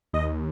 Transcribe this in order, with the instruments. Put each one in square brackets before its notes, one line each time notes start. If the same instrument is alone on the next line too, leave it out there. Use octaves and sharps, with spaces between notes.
[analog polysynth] D#2 D#5